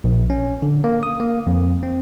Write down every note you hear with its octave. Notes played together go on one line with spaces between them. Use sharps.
A#1
C#4
D3
A#3
D#6
A#3
F2
C4